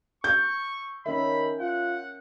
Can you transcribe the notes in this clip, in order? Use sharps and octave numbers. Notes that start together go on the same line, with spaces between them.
C#6 G6
D#3 C#4 A#4 E5 B5
F4 F#5